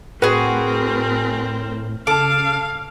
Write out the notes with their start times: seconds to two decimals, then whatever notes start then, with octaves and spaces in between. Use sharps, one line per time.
0.22 A2 C4 F#4 G#4 A#4 B4
2.07 C#3 A4 F5 A5 D6